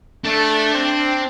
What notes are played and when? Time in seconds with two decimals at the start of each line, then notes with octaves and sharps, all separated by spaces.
0.25 A3 D4
0.73 C4